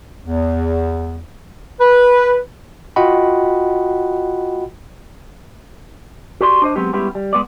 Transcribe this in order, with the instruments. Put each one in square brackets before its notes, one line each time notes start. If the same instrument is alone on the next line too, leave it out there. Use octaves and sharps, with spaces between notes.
[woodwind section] E2
B4
[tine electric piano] F4 F#4 D#5 F#5 G5 B5
[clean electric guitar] F#4 G4 D5 C6
D4 C5 D#5
F#3 G#3 B3 C4 G4
G3 G#3 B3 C#4 E4 G4
G3
G#3 B3 D5